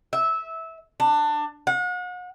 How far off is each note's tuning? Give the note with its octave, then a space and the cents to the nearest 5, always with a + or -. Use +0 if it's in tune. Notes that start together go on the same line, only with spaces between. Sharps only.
E5 -15
D4 +20
F#5 -40